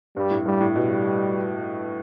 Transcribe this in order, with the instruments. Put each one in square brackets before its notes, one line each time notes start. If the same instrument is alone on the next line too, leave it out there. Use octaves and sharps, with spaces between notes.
[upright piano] G2 [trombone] G3
[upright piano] A2
[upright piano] G2 [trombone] G3
[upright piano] A2
[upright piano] B2 [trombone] G3